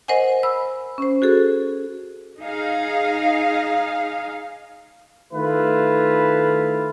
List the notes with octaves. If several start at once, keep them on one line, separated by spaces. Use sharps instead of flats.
A#4 C5 D#5 F#5 G#5
B5 E6
C#4 C5
F#4 G#4 A4
D#4 G#4 F5
D#3 A3 E4 F4 B4